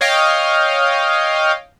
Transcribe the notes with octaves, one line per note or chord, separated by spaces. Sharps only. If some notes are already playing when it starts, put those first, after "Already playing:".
C#5 D#5 F5 G5